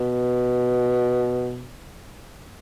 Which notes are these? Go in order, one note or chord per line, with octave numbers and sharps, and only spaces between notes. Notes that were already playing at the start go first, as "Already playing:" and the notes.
Already playing: B2